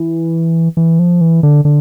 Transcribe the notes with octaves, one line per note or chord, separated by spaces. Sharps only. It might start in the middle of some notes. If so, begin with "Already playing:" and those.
Already playing: E3
E3
F3
E3
D3
D3